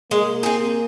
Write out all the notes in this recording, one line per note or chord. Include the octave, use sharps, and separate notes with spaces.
G#3 A#3
C4 G#4